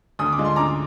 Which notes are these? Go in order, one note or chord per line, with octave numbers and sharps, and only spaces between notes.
D2 D#6
D6
D3 G#3 D4 F4
C6
D2 A#5 D6